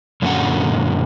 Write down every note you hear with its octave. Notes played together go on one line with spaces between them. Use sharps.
F#2 A#2 D3 F#3 C#4 F#5